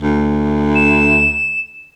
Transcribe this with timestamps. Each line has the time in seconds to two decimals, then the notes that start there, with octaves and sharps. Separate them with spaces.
0.01 D2
0.75 E7